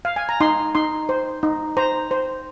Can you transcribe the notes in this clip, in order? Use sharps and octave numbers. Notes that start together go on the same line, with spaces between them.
F5
G#5
A#5
D#4 C6
D#4 C6
C5
D#4
C5 A#5
C5